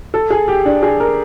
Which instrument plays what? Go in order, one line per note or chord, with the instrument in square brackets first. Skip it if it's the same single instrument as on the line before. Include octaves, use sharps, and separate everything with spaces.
[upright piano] A4
G#4
G4
D4
G#4
A#4